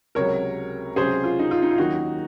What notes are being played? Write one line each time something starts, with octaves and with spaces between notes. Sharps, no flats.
C#2 C3 F#3 A#4 C#5
C#2 C3 F#3 C#4 G#4 C5
F4
D#4
F4
D#4
F4
D#2 D#3 F#3 C#4 D#4 F#4